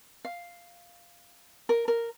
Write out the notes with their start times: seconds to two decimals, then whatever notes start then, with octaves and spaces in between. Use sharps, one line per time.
0.25 F5
1.69 A#4
1.88 A#4